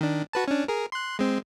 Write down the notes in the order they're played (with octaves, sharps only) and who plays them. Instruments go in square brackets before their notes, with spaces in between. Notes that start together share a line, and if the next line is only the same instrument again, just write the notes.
[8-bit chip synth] D#3 D4
F#4 B4 A5
C#4 D4
G#4 A#4
C6 F#6
G#3 C4